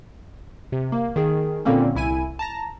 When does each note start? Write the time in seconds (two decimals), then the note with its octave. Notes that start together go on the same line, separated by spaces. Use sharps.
0.72 C3
0.92 A#3
1.16 D#3 G#4
1.65 A#2 D3 G3 A#3 C4 C#4
1.95 C2 E4 G#5 D#7
2.39 A5 A#5 A#6